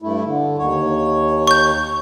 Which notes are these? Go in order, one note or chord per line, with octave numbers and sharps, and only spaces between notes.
G2 A3 E4
D3
D#2 C#5
C#6 G6